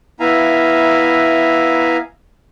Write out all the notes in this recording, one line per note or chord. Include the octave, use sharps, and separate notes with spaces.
B3 E4 E5 F5 G#5 A#5